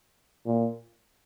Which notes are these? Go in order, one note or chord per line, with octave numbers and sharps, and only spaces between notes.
A#2